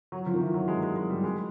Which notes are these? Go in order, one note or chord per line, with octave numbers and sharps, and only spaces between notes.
F#3
F3
D#3
E3
F#3
G#3
G#3
G#3
G3
G#3